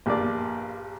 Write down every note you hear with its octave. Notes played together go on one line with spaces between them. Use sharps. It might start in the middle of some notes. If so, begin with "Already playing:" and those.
A#1 G2 A#3 D5